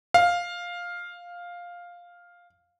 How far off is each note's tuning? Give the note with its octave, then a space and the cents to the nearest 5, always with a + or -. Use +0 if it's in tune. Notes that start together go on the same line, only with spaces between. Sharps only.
F5 +5